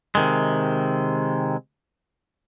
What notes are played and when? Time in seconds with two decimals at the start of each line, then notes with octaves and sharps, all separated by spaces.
0.15 C3 D#3 G#3